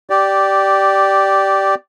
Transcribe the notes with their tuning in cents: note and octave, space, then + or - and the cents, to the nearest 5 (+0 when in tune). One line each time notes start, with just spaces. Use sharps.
G4 -10 D5 +0